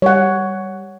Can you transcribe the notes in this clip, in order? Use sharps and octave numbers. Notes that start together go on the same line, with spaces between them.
G3 C#5 F#5